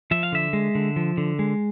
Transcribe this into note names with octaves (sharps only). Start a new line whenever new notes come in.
F3 E5
F5
D3 E5
G#3
D3
F3
D3
G#3